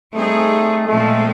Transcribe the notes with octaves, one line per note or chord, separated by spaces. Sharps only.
G3 A3 C4 D#4 G#4
A#2 F3 G#3 A3 C4